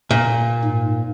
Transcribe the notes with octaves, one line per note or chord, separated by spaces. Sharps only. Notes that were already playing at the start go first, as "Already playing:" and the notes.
A#2
G#2